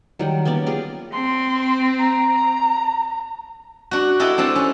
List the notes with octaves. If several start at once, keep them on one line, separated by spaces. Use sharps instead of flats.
D#3 F#3 G3
A#3 B3 C#4 D5
F4 G4 G#4 A#4
C4 C6
A#5
D4 F#4
E4 G4 A4 D#5
C4 D4 A4 A5
C#4